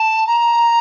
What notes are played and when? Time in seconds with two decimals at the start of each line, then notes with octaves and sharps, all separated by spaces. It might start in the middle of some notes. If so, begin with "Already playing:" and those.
Already playing: A5
0.26 A#5